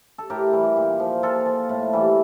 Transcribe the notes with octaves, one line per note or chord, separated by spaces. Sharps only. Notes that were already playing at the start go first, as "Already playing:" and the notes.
A4
A2 G4 A#4
E3 G3
A#2
F3
A#2 F4 A4
F3
A2
E3 G3